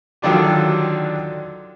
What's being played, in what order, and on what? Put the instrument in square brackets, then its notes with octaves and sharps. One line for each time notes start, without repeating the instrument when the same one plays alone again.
[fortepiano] D3 D#3 F#3 D4 F4 G4